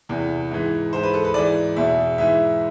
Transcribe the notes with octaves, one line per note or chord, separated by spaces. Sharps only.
E2 C3 E3
G#2 E3
G#2 E3 C5
B4
A4
B4
G#2 E3 D5
E2 B2 E5
G#2 E3 E5